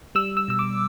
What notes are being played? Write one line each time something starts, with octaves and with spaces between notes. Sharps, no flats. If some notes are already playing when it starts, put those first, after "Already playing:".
G3 E6
E6
B2 E6
D6